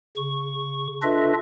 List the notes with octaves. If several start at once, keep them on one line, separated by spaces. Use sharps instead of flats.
C#3 C#6
D4 F4 A4 B4 D#5 E5